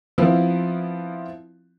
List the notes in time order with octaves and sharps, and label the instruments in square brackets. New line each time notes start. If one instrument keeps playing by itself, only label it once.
[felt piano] F3 B3 C4 E4 F4